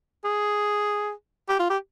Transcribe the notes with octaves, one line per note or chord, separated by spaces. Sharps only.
G#4
G4
F4
G4